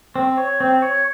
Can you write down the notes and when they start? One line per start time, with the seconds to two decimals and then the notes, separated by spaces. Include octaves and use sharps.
0.16 C4
0.38 C#5
0.60 C4
0.82 C#5